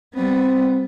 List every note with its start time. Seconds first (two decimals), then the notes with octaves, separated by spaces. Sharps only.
0.15 G3 B3 C4